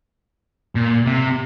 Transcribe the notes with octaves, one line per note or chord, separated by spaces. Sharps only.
A#2
C3